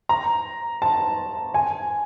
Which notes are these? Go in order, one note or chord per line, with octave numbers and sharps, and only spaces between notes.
A#5
A5
G#5